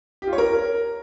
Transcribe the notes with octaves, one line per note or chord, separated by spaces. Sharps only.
G4
F4
C#5
A#4